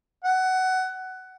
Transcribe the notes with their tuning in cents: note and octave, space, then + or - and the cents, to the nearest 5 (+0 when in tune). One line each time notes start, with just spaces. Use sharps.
F#5 +15